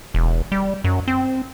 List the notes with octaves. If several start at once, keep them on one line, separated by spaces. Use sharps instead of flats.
E1
G3
F#2
C4